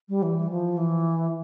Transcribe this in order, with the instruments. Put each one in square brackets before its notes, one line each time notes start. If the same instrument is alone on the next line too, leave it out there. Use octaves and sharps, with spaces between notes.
[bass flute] G3
E3
F3
E3